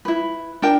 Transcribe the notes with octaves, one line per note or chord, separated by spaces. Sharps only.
E4 B4
D4 A#4 G5